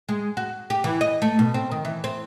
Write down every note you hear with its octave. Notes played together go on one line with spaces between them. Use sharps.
G#3
F#4
G4
E3
D#5
A3
B2
C4
D#3
E3
C4